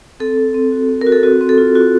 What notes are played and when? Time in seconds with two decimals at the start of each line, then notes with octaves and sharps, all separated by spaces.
0.20 C4 A4
0.38 C4
0.54 C4
0.72 F#4
0.89 C4
1.01 A#4
1.07 F#4
1.12 A4
1.23 C4 F#4
1.41 C4
1.49 A4
1.58 F4
1.75 F4 F#4